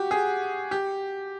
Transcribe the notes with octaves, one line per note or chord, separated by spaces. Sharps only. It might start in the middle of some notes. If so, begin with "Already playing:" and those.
Already playing: F#4 G4
G#4
G4